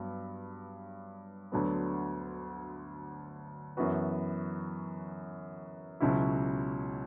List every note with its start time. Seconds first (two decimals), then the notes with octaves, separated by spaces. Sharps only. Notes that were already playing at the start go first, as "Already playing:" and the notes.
Already playing: G2 F#3 B3
1.52 D2 D3 F#3 B3
3.77 F#2 E3 B3 F#4 B4
6.00 C#2 B2 F#3 C#4 E4